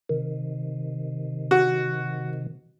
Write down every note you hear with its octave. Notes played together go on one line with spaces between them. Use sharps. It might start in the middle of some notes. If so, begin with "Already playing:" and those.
C3 D#3
F#4